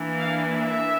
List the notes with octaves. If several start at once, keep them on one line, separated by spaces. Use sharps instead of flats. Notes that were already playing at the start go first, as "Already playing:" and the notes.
Already playing: E3 A#3 D4
F5
E5